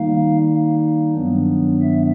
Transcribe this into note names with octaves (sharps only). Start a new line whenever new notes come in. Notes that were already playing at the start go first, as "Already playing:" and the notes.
Already playing: D#3 G3 A#3 D#4 F5
G2 D#3 F#3 B3 D4
E5